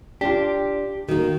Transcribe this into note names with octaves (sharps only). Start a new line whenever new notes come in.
D4 F4 G4
D#3 A#3 F#4